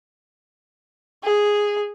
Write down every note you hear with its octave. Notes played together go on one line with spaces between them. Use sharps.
G#4